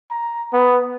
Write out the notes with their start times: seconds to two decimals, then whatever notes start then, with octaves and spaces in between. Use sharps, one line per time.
0.11 A#5
0.53 B3